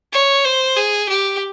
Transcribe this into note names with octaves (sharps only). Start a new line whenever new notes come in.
C#5
C5
G#4
G4